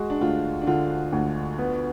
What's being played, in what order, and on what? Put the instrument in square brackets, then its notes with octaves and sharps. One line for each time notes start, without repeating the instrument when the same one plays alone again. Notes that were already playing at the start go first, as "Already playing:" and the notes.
Already playing: [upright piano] G#3 [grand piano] F#4
[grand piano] D4
[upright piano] D2 [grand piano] F4
[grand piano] D4
[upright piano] D3 [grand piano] F4
[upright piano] D2
B3